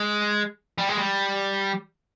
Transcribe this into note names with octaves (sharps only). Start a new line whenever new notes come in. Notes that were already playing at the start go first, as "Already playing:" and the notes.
Already playing: G#3
G3
G#3
G3